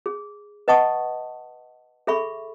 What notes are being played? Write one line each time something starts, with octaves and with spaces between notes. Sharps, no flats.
G#4
B4 D#5 F#5 A5 C#6 D#6
G#4 A4 E5 B5 C#6